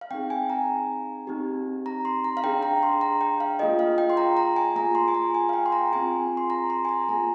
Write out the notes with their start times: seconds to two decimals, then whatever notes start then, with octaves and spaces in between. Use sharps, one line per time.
0.01 F5
0.11 C4 D#4 G#4 G5
0.30 G#5
0.50 A#5
1.27 C4 D#4 G4
1.86 A#5
2.05 C6
2.24 A#5
2.37 F5
2.44 D4 G#4 G5
2.63 A#5
2.83 C6
3.01 A#5
3.21 G5
3.40 F5
3.59 A#3 F4 G#4 D#5
3.79 F5
3.98 G5
4.10 C6
4.17 A#5
4.37 A#5
4.56 G#5
4.76 A#3 F4 G#4 A#5
4.95 C6
5.08 G#5
5.15 A#5
5.34 G#5
5.49 F5
5.53 G5
5.66 C6
5.72 A#5
5.92 C4 F4 G#4 G#5
6.37 C6
6.50 A#5
6.70 C6
6.85 G#5
6.89 A#5
7.09 A#3 F4 G#4 A#5